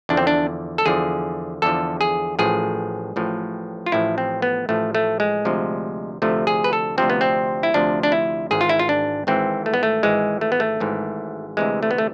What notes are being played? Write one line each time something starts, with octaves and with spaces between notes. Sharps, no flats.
E2 D3 F3 D4
C4
D4
A4
E2 D3 F3 G#4
E2 D3 F3 A4
G#4
A1 A2 F3 G#4
A1 A2 F3
F4
A1 A2 F3 E4
C4
B3
A1 A2 F3 A3
A3
G#3
D2 C3 F3
D2 C3 F3 A3
G#4
B4
A4
D2 C3 F3 C4
B3
C4
E4
D2 C3 F3 D4
D4
E4
G#1 G#2 E3 G#4
F4
E4
F4
D4
G#1 G#2 E3 C4
A3
B3
A3
G#1 G#2 E3 G#3
A3
B3
A3
G#1 G#2 E3
D2 C3 E3 G#3
A3
B3
A3